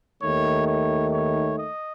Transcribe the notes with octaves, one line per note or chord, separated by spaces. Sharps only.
D#2 D#3 A3 C#5
C#5
C#5
D#5